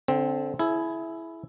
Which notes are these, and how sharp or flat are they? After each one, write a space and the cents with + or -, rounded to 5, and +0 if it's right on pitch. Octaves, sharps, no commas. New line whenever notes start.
D3 -20 C4 +0
E4 +5 G#4 +30